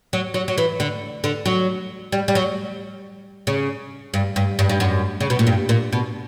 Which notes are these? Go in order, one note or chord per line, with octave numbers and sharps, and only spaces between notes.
F#3
F#3
F#3
E3
D3
D3
F#3
G3
G3
F#3
C#3
G2
G2
G2
G2
F#2
C#3
B2
A#2
G2
A#2
B2